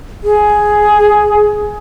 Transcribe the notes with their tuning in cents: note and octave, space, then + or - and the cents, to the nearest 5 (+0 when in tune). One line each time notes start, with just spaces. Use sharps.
G#4 +10